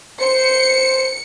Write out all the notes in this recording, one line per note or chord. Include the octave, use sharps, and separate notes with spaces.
C5 C#7